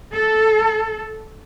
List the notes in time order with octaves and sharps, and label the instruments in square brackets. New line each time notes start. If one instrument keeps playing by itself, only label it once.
[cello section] A4